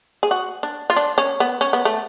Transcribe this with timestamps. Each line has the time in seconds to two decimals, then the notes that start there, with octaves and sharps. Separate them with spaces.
0.23 G#4
0.31 F#4
0.63 D4
0.90 F4
0.97 D4
1.18 C#4
1.40 B3
1.61 C#4
1.73 B3
1.85 A3